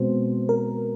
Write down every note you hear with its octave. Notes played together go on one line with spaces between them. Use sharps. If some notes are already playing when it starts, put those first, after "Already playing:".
Already playing: B2 G#3 C4 C5
A#4